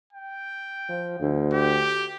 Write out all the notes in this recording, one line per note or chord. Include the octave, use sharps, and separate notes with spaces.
G5
F3
D2
G4